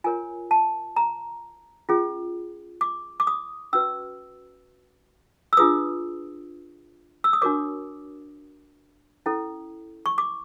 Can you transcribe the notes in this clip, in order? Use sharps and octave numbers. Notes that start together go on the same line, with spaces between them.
F4 A#4 C#5 G#5
A5
A#5
C#4 F4 G#4
D6
D6
D#6
C#4 F#4 B4 E6
E6
D4 F4 G#4 B4 D#6
E6
D#6
D4 F#4 A#4 C#5 D6
C#4 E4 A4
C#6
D6